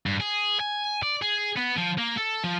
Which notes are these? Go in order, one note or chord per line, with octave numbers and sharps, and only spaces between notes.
G2
G#4
G#5
D5
G#4
B3
F3
A#3
A4
F3